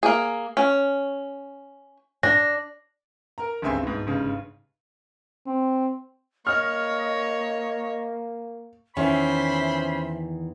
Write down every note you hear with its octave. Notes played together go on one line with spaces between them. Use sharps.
A#3 G#4
C#4
D4 A#6
A#4 A#5
G1 C#2 C4 E5 G#5 C6
G#2 B2
G1 G#2 C#3
C4
A#3 C#5 D#5 F6
E2 D#3 E3 C#4 C5 E5 B5 C6